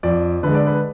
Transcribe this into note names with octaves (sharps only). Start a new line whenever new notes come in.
F2 D5
D3 G#3 B4
D5
B4